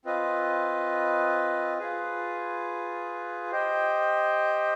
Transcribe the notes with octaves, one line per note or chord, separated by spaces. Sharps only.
C4 F4 B4 D#5
F4 G#4 B4
G4 C5 D#5 G5